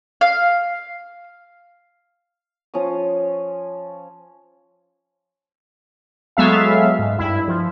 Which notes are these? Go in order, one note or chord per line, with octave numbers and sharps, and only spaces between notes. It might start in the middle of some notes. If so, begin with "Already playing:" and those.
F5
F3 C#4 C#5 D#6
F#3 G#3 B3 A4 E5 F5
G#2
G2 E4
F3